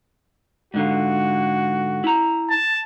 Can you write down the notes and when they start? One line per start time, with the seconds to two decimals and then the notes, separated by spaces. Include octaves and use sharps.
0.74 G#2 D3 F4 F#4
2.04 E4 A#5
2.50 A5